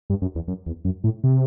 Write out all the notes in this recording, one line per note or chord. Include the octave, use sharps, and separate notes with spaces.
G2
F#2
E2
F#2
E2
F#2
A2
C3